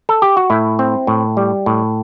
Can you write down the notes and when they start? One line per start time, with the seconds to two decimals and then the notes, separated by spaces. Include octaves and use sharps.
0.09 A4
0.22 G4
0.37 F#4
0.50 A2 E4
0.79 C4
1.07 A2
1.37 G3
1.66 A2